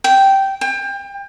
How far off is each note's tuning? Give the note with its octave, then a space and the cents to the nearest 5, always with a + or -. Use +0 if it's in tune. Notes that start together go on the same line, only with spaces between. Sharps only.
G5 -10
G5 +30